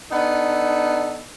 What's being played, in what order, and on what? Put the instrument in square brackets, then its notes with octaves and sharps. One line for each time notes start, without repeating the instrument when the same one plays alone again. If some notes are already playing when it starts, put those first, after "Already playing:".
[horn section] B3 D4 D#4 A4